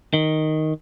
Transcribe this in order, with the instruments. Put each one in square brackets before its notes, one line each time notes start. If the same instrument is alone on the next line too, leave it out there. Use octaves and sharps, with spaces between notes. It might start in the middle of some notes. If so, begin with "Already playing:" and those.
[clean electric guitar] D#3